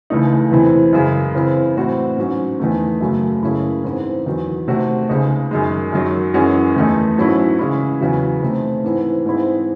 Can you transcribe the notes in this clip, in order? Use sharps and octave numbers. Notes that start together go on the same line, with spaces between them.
C#2 C#3 E3 A3 D#4
E2 C3 E3
F#2 C#3 G#3
C#3 E3 C4
A2 E3 C4 F#4
G#2 F#3 C#4
E2 D#3 A3
F#2 C#3 F#3 A3
F#2 C#3 G#3 C#4 E4
G#2 E3 C4
E2 D#3 F#3
C3 D#3 A3 C4 F#4
C#2 C#3 G#3 D#4
F#2 D#3 G#3
F#2 D#3 F#3
F#2 E3 G#3 C#4 F#4
E2 D#3 A3 D#4
G#2 F#3 C#4 E4
C#3 E3 G#3 C#4 E4
E2 C#3 F#3
C3 D#3 A3
G#2 E3 C4
G#2 E3 G#3 C4 E4